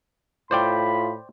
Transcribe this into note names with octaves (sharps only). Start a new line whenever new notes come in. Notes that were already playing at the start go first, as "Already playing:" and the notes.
A2 F4 C5 D5 G5 B5